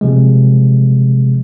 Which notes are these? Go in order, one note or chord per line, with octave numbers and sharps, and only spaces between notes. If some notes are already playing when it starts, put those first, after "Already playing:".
C3 F3 G#3